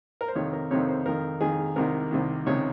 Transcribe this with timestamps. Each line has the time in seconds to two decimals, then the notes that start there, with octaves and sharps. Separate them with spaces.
0.21 A#4
0.28 C5
0.35 F2 C3 D#3 C#5
0.53 A#4
0.71 F2 C3 D#3 C#5
0.88 C5
1.05 F2 D#3 A#4
1.41 F2 D#3 G#4
1.76 C2 C3 D#3 A#4
2.11 C2 C3 D#3
2.46 C#2 C3 D#3 C#5